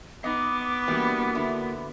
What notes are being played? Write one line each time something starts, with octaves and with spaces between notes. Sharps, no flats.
B3 D#4 D#5 D6
E3 G3 A#3 D4 F#4
D3 E4